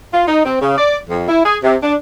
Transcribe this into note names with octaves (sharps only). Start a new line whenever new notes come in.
F4
D#4
C4
C#3
D5
F2
E4
G#4
C3
D4